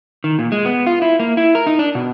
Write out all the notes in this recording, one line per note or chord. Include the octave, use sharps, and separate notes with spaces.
D#3
A#2
G#3
B3
F4
E4
A#3
E4
A#4
D#4
D4
B2